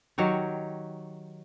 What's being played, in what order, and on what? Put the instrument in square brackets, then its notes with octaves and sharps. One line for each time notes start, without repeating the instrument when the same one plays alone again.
[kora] D#3 F#3 G4 C#5